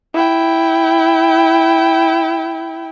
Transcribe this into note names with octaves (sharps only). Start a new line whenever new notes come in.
E4 G5